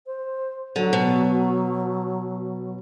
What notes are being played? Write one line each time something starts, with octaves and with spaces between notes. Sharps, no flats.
C5
D3 F#3
B2